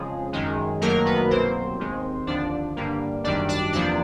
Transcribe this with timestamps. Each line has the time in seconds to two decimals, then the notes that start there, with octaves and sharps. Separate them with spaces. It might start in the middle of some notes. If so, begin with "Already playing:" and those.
Already playing: F2 C#3 F3 G#3 G#4
0.33 F#2 D#3 G#3
0.81 G1 F#2 D#3 F#3 A3 A#3 A#4
1.05 B3 B4
1.30 C2 B2 F#3 A#3 C4 C5
1.79 D#2 D#3 G#3
2.27 D#2 D3 F3 D4 D5
2.76 G2 D3 G3 A#3
3.24 G#1 F#2 D#3 G3 D4 D5
3.49 D4 D5
3.73 E2 C3 F3 A#3 D4 D5